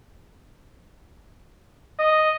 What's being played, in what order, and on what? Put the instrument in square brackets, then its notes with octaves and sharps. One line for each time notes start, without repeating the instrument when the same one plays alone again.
[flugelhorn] D#5